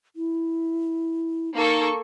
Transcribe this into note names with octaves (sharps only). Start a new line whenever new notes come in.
E4
A#3 D#4 A4 C#6